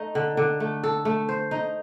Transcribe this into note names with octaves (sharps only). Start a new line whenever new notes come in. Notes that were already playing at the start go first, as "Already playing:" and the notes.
Already playing: A3 D#4
D3
D3
A3
A4
A3
C5
D#4